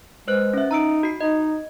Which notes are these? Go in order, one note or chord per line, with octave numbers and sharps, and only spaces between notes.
G#3 B4 C5 F#6
C#4 E5
D#4 A#5 E6 D7
F#4 C7
D#4 D#5